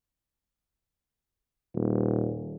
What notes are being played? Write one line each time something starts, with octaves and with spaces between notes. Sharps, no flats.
D#1